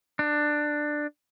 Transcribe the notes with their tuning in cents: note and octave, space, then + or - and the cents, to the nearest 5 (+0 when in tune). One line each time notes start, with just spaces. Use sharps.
D4 +15